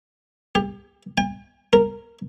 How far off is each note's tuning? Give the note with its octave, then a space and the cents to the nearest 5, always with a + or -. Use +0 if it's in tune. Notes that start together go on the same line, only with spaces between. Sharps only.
G4 +30
G5 +45
A#4 -10